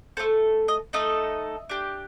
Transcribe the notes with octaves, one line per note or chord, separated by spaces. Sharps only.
A3 D#4 A4 C5
D#5
A3 D#4 A4 D#5
D4 G4